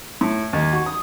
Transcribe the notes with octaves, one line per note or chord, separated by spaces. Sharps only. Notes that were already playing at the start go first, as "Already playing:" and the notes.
A2
D#2
F#4
D#6